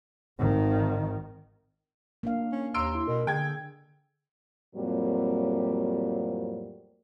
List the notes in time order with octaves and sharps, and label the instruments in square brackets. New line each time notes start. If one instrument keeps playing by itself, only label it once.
[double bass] G#1 D#3
[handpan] A#3 D4 F5
[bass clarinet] C#4
[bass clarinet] D#2 [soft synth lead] A#5 [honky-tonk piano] C6 E6 D7
[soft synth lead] E4
[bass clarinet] B2 [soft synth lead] A#4
[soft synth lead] D3 [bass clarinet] G#4 [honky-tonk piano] G5 G#6
[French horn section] F2 A2 F#3 G3 A#3 C4